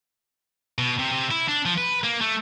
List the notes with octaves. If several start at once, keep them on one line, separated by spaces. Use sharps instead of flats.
B2
C3
C3
E4
D4
F3
B4
A#3
A3